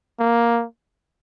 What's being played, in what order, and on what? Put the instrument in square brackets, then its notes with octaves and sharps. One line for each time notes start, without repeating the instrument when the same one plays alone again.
[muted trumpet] A#3